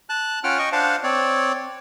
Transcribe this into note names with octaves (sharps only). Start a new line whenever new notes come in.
A5 F#6
C#4 F4 F#5 G5 F6
D#5 G5 C#6
D4 C5 F5 F#5 A5
C4 C#5 D5